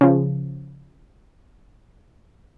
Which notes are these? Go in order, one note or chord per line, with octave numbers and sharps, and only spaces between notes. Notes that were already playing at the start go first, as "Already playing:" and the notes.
C#3 F3